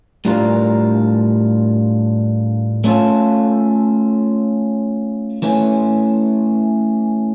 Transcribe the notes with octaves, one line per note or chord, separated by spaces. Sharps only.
A2 G3 D4 F4 A#4
A3 C#4 F4 A4
E3 A3 C#4